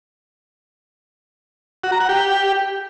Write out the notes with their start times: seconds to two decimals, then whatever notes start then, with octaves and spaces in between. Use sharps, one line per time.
1.84 F#4
1.92 A#5
2.00 F#5
2.09 G4